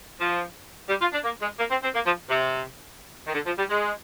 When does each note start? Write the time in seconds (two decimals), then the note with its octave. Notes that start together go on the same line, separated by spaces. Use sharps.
0.20 F3
0.89 G3
1.01 F4
1.13 D4
1.24 A#3
1.41 G#3
1.59 A#3
1.71 C4
1.83 C4
1.95 A#3
2.06 F3
2.30 C3
3.27 D#3
3.34 D3
3.46 F3
3.58 G3
3.70 G#3